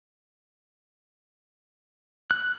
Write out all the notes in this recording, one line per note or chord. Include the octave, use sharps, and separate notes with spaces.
F#6